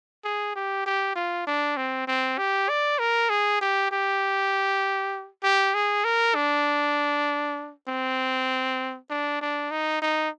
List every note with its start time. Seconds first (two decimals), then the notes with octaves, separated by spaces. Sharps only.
0.24 G#4
0.56 G4
0.86 G4
1.15 F4
1.47 D4
1.77 C4
2.08 C4
2.38 G4
2.69 D5
2.99 A#4
3.30 G#4
3.61 G4
3.91 G4
5.43 G4
5.74 G#4
6.04 A#4
6.35 D4
7.88 C4
9.10 D4
9.41 D4
9.71 D#4
10.02 D#4